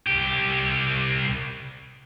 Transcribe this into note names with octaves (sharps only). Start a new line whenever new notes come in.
C2 G4